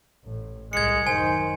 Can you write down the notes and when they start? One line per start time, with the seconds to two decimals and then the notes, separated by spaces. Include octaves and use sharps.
0.25 A1 A2
0.73 C2 A2 G#3 G#6 C#7
1.07 F#2 D#3 C5 G#5